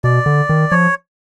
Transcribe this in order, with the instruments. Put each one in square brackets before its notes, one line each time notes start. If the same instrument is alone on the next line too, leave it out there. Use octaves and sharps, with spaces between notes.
[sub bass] B2 [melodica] D5
[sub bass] D3
D#3
[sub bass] F3 [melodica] C#5